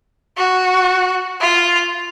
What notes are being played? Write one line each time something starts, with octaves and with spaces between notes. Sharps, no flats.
F#4
F4